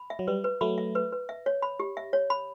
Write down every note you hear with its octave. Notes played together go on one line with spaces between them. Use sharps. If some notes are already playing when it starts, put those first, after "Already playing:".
Already playing: B5
E5
F#3
G3 B4
B4
F#3 A3 B5
E5
B4
B4
E5
C#5
B5
G4
E5
C#5
B5